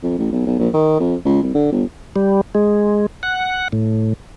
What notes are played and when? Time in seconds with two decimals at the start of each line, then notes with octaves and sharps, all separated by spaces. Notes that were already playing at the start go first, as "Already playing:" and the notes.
0.03 F2
0.18 A1
0.32 B1
0.47 B1
0.59 A#1
0.74 D#3
0.99 F2
1.25 C#2
1.42 C2
1.54 D3
1.72 G1
2.16 G3
2.55 G#3
3.23 F#5
3.72 A2